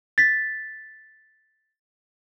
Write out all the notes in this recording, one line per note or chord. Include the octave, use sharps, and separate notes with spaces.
A6 B6